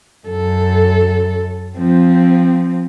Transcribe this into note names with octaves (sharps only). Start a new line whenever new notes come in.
F#2 A4
F3 C4